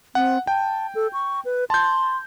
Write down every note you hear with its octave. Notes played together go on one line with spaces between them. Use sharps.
C4 F#5
G5 A5
A4
C#6
B4
A5 C6 G6